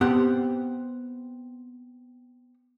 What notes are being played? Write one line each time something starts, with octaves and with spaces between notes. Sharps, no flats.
B3 C4 G4 F#5